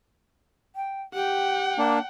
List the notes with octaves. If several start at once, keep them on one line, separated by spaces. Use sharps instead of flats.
G5
G4 F#5 G5
A#3 D4